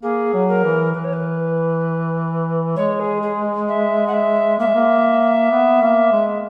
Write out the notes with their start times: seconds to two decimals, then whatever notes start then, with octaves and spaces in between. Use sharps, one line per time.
0.03 A#3 G#4
0.34 F#3
0.49 A#4
0.64 E3
0.94 E3 B4
1.04 C#5
1.13 B4
2.76 G#3 C#5
3.00 G#4
3.22 G#4
3.68 E5
4.07 F#5
4.14 E5
4.59 A#3 E5
4.67 G#3
4.75 A#3
5.51 B3
5.81 A#3
6.12 G#3